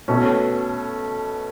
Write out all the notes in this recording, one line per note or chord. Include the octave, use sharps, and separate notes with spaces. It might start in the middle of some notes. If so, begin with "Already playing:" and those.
B2 A3 C#4